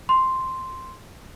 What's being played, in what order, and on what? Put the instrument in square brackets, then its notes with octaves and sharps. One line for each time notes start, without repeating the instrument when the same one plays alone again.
[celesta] C6